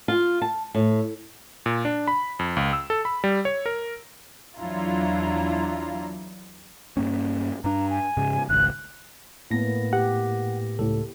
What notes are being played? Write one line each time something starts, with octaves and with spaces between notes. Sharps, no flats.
F4
A5
A2
A#2
D4
B5
F2
C#2
E6
A4
B5
G3
C#5
A#4
E2 F#3 D4 E4 F4 A#5
G2 A#3 C#4
G2 D4 A#5
G#5
G#2 C#3 G#3
G#1 C#2 F#6
A2 A#3 B3 A#6
G4 F#5
C#2 A2 A4